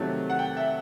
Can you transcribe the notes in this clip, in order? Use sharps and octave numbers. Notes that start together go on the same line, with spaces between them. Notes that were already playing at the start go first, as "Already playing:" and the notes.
Already playing: C3 D#3 F#3 A3
F#5
G5
E5